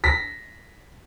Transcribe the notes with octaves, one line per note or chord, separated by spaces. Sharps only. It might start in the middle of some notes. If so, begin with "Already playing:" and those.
A#6 B6